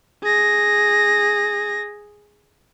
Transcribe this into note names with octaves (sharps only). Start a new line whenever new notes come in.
G#4 A#6